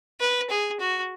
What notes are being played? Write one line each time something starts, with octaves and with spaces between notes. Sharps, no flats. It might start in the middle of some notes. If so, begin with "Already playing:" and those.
B4
G#4
F#4